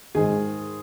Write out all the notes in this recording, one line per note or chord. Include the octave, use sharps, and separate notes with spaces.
G#2 D#3 G#4